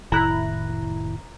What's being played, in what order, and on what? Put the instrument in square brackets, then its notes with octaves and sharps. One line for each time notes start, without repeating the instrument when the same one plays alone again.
[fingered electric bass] F1 A2 D#3 [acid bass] E4 [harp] A#5 F#6